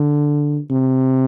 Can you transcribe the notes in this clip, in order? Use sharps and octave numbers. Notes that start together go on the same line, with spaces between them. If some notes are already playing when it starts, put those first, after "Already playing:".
Already playing: D3
C3